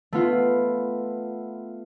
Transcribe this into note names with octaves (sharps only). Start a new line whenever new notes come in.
A3 B3 F4